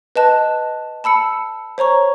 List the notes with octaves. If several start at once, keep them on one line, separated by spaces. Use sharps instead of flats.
B4 D#5 A5 F#6
A5 B5 E6 C#7
C5 C#5 A#5 C#6